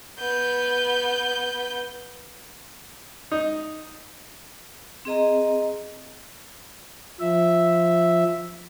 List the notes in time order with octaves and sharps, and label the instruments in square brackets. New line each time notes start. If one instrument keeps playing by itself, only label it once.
[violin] B3 G6
[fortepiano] D#4
[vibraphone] C4 G#4 D#5 A#5
[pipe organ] F3 E5